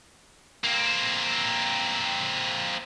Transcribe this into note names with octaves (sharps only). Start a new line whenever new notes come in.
A#3 C4